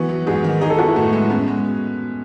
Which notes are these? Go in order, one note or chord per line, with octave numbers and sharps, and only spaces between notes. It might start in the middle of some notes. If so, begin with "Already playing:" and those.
Already playing: E3 B3 F#4
F#3
G#2 G#4
D#3
D#4 G#4
A4
B3 F#4
E4
A2 A3
G#3
B3 C#4
G#3